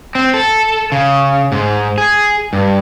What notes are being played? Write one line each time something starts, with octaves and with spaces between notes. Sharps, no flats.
C4
A4
C#3
G#2
G#4
G2